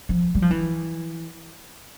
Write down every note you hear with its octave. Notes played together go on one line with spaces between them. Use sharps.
F3
G3
F3
E3